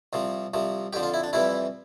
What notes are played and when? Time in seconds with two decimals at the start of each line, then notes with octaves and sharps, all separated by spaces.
0.13 C2 C3 F3
0.54 C2 C3 F3
0.93 F2 D3 F3 G4
1.03 F4
1.14 E4
1.24 D4
1.33 F2 C3 E3 G3 E4